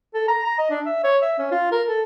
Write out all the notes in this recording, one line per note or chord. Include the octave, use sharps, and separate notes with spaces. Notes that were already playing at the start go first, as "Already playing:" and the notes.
A4
A#5
A#5
D#5
D4
E5
C#5
E5
C#4
F4
A#4
A4